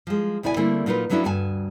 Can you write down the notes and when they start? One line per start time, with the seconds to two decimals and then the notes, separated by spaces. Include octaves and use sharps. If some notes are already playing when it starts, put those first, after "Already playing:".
0.07 F3 G#3
0.43 D2 B2 E4 D5 G#5
0.57 D3 G3 A3 A#3 C4 E4
0.86 A#2 F#3 D#4 F4 A#4 B4
1.09 F3 F#3 A3 C#4 D4 E4
1.25 D2 G2 F#4 G#5 A5